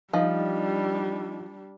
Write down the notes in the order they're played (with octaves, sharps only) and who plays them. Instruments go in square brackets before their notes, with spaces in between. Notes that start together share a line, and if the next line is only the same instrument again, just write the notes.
[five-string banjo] F3 [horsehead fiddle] G3 D4 [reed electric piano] D#4 D#5